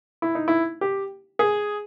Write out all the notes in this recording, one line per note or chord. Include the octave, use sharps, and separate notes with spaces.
E4
D#4
E4
G4
G#4